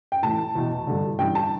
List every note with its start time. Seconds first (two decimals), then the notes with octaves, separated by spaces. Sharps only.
0.12 G5
0.22 A2 E3 A5
0.55 E2 B2
0.87 G2 D3
1.19 G2 E3 G5
1.35 A5